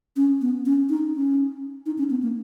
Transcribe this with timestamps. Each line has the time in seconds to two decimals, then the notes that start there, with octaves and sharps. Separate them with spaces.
0.16 C#4
0.41 B3
0.66 C#4
0.89 D#4
1.14 C#4
1.86 D#4
1.98 C#4
2.10 B3
2.23 A#3